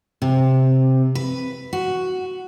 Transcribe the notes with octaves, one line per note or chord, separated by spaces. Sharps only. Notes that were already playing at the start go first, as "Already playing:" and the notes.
C3
B4
F#4